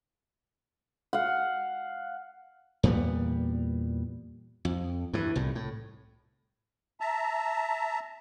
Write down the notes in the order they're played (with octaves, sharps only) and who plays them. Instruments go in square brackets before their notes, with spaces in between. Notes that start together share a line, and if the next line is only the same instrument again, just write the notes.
[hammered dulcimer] F5 F#5
[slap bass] E2 A#2 G3 B3
F2
G2 E3
C2 A2
A2
[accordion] E5 A5 A#5